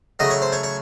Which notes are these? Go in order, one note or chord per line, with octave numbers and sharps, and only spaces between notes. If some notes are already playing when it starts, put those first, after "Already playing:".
C#3 F#3 A3 D#5
C#5
C5
C#5
C#5